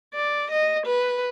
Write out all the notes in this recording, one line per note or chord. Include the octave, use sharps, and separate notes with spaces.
D5
D#5
B4